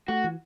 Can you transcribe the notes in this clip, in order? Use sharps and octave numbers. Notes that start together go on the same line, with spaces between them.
A3 F#4
E3